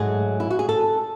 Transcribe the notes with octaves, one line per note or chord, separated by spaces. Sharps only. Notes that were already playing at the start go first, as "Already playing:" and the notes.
Already playing: G#2 F#3 A3 G#4
E4
F#4
G#4
A4